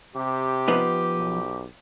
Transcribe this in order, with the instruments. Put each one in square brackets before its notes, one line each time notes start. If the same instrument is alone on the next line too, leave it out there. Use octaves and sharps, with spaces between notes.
[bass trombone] C3 [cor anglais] G4
[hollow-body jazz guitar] F3 B3 D#4
[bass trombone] B1